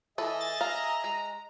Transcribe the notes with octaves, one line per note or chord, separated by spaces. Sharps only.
E3 G#4 A4 D#5 E5
A6
F5 A#5
G#3